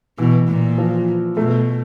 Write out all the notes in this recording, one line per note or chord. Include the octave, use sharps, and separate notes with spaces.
B2 E3
A#2
F3
B2 A3